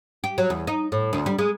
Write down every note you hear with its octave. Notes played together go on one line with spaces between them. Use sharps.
G4
F#3
E2
D#4
A2
D2
G3
G#3